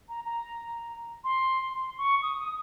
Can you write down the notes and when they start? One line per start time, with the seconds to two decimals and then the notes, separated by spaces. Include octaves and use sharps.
0.09 A#5
0.26 A#5
1.24 C6
1.73 C6
1.98 C#6
2.22 D#6
2.39 D#6